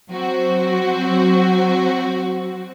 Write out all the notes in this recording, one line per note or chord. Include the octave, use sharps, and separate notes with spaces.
F#3 C4 F#4